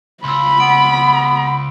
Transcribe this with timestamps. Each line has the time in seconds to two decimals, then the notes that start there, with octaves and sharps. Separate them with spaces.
0.24 C#2 B5 C6 E6
0.60 B3 D7